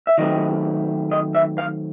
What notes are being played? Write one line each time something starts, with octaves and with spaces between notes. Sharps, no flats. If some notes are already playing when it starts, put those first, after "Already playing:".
E5
D#3 F#3 A3 C4 D#5
D#5
E5
F5